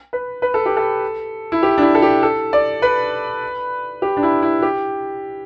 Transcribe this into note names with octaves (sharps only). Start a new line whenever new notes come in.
B4
B4
A4
G4
A4
E4
G4
D4
E4
A4
G4
A4
D5
B4
G4
D4
E4
E4
G4